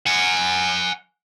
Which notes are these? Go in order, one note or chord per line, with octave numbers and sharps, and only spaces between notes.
F#5 G#5